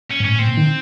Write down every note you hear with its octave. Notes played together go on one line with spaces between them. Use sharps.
C#4
G#2
A2 C#4
A2 C4
A#2
D#3